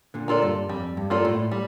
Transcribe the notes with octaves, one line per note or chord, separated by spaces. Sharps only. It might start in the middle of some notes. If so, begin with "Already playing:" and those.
A#2 D3
A#3 F4 A4 D5
G2
F2 G3
G2
A#3 F4 A4 D5
A2
G3